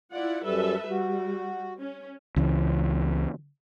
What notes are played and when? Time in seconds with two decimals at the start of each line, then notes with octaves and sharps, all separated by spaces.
0.12 E4 F4 D5 F#5
0.44 F#2 G3 A4 B4 E5
0.90 G3 F#4
1.78 C#4
2.36 C#2 E3